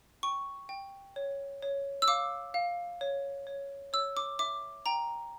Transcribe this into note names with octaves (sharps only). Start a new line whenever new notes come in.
G5 C#6
G5
C#5
C#5
E6
F5 D6
F5
C#5
C#5
C#5 E6
D6
E5 D6
G5 A#5